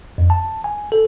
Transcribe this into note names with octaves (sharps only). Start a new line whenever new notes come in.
F2
A5
G#5
A4